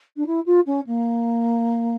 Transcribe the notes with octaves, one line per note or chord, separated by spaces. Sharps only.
D4
E4
F4
C#4
A#3